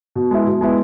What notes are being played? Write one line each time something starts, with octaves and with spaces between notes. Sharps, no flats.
B2
G#3 B3 E4
B2
G#3 B3 E4